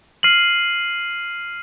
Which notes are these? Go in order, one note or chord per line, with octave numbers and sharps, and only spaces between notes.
F6 C7 D#7 F#7